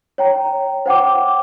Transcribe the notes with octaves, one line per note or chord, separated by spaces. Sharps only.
C#5 G5 A#5
C5 F#5 G5 D6